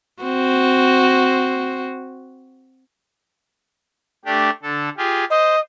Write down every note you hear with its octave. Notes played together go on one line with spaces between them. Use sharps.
C4 F#4
A3 D4 G4
D3 A4
F4 G4 G#4
C5 D#5